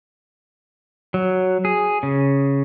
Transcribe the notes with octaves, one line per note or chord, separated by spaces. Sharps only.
F#3
G#4
C#3